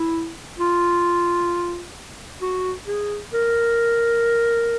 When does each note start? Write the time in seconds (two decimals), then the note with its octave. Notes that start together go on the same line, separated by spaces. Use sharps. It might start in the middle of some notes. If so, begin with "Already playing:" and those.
Already playing: E4
0.58 F4
2.42 F#4
2.87 G#4
3.33 A#4